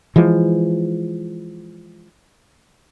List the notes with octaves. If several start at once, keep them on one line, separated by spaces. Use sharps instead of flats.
E3 F3 G#3